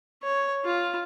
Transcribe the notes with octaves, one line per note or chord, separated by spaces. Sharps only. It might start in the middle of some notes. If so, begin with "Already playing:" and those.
C#5
F4